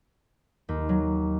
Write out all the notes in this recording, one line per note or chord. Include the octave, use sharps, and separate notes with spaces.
D#2
F#3